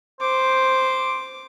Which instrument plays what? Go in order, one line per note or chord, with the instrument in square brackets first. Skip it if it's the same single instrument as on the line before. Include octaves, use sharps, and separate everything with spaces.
[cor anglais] C5 [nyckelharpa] D6